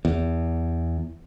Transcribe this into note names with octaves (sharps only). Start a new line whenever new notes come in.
E2